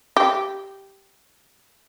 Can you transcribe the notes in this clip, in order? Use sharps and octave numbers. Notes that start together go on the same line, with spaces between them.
G4